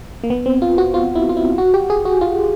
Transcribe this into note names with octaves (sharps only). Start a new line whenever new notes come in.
A#3
B3
C4
F4
F#4
F4
E4
F4
E4
F#4
G4
G#4
F#4
F4